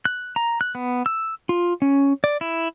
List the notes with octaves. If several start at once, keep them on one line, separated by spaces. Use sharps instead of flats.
F#6
A#5
F#6
B3
E6
F4
C#4
D5
E4